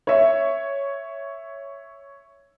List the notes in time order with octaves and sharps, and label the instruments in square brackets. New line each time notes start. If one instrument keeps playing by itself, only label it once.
[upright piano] C#5 E5